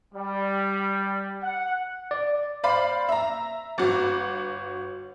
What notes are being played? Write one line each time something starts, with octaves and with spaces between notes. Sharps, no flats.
G3
F#5
D5
C5 D5 F5 B5
E5 A#5
G1 F#4